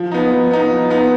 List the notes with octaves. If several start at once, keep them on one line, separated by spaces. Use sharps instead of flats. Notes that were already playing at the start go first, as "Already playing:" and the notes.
Already playing: F3
B3 D#4
F3
B3 D#4
F3
B3 D#4